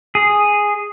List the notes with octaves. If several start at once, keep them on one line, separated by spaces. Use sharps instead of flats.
G#4